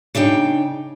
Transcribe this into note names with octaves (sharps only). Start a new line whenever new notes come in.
C#3 D4 D#4 G5